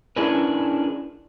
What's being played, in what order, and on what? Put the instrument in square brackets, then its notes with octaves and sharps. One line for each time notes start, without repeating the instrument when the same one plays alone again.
[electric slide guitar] C#4 D4 E4 G#4 A#4 B4